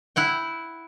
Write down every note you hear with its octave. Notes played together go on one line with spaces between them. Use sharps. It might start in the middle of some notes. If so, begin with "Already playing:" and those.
E4 F#5 G5